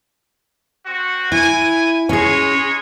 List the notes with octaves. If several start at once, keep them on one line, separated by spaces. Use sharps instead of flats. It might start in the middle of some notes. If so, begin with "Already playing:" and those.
C4 F#4
E4 G#5
G#3 C#4 D#4 G#4 C#5